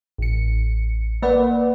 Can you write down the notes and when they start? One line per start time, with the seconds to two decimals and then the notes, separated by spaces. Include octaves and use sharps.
0.18 A1 C#7
1.22 A#3 B4 D5 F#5